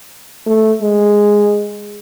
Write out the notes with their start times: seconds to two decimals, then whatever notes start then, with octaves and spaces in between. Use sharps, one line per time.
0.46 A3
0.82 G#3